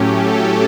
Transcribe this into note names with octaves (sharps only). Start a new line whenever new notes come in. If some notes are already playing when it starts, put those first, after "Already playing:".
Already playing: A2 F#3 A3 C#4 G4
A4